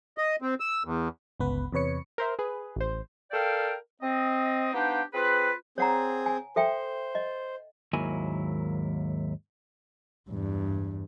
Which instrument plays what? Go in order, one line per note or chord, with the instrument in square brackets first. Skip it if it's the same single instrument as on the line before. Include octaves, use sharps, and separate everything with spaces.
[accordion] D#5
C4
E6
E2
[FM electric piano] G1 C#2 B3 B4
E2 C3 B4 C#5 C#7
[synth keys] A#4 C5 E5
G#4 B4
A1 C5
[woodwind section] A4 A#4 D5 F5 G5
C4 D#5
B3 D4 D#4 G4 C5 F5
C4 F4 G#4 B4
[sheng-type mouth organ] C4 G#4 [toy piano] C#5 F#5 A#5
[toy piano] G#5
[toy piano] A4 E5 G5 [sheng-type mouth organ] C5
[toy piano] D#5
[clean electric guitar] D#2 G#2 F#3 A#3 E4 G#5
[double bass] E2 G2